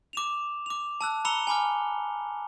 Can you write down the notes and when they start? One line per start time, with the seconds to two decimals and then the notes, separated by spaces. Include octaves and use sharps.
0.13 D6 E7 F7
0.66 D6 F7
1.01 A5 E6 F#6
1.25 A#5 B5 E6 C#7 F7 G7
1.47 G#5 B5 D6 F6